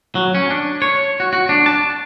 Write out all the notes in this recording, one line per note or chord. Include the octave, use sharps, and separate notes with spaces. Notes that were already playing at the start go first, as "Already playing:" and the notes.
F#3
C#4
D4
C#5
F#4
F#4
D4
A5